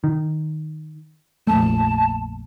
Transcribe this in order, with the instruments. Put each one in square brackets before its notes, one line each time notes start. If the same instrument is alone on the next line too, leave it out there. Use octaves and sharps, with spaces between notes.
[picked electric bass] D#3
[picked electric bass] A#1 F2 A3 [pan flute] A5